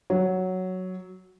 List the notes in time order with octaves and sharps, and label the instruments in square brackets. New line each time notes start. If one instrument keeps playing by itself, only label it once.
[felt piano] F#3